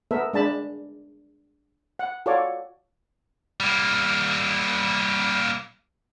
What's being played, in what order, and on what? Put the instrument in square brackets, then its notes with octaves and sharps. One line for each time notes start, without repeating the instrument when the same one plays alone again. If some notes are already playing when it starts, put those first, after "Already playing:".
[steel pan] B3 A4 A#4 E5
G#3 D4 A5 B5
F#5
F4 F#4 A4 C#5 D5
[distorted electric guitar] G3 A#3